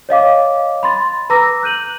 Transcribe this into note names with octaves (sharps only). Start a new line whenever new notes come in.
C#5 D#5 F5 D6
B5 C6 A6
B4 A#5 D6 E6 A#6
F#6 G6 D#7 F#7